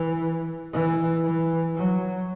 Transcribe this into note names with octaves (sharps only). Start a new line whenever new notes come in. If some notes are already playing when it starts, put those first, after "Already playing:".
Already playing: E3
E3
E3
F#3